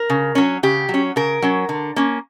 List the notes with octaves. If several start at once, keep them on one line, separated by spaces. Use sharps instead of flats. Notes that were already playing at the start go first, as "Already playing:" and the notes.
Already playing: A#4
C#3
F#3 C#4
C#3 G4
F#3
C#4
C#3 A#4
F#3 C#4
D3
A#3 C#4